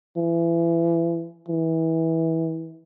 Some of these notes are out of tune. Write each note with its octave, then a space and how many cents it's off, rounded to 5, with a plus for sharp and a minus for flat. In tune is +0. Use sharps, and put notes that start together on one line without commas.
E3 +30
E3 -25